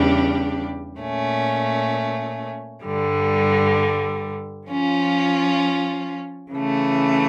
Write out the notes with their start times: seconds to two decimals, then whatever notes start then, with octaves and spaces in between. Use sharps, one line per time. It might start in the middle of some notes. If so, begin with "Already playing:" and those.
Already playing: E2 C#3 G3 D4 G4
1.00 A#2 A3 C#4
2.84 G2 D3 G3
4.68 F3 C#4 F4
6.53 C#3 E3 A3